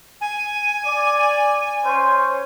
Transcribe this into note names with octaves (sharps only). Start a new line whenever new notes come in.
G#5
D5
C#4 C5 C#5